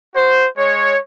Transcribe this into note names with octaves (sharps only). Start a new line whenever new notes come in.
F#4 C5
G#3 C#5